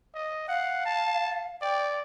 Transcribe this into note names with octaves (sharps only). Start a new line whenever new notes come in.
D#5
F5 F#5
A5
D5 G5